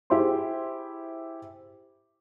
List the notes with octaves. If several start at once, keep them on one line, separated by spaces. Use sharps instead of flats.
E4 G4 G#4 C5 C6